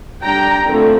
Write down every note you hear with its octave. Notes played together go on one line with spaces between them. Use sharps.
G3 D4 G5 A#5
D3 F3 A3 C4